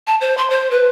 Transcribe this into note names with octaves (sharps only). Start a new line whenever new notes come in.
A5
C5
C6
C5
B4